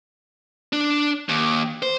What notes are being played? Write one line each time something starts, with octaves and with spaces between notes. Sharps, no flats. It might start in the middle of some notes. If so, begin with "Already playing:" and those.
D4
D#2
C5